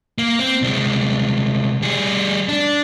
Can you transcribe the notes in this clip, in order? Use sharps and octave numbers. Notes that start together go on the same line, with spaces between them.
A#3
C4
C2 G#3
G3 G#4
D4